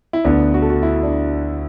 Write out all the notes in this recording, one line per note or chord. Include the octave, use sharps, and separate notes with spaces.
E4
D2 D3 B3 D4
F#4
A4
F#4
E4
D4